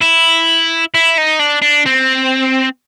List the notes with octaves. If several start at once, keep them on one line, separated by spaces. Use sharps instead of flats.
E4
E4
D#4
D4
D4
C4